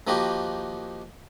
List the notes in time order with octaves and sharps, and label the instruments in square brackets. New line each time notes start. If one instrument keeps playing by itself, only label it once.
[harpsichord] D#3 F3 A#3 D#4 F#4 G4